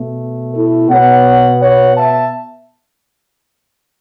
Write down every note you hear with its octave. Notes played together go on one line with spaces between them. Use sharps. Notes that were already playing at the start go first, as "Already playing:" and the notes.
Already playing: B2 A3
E4 A4
B2 B3 C#5 F#5
C#5 F#5
E5 A5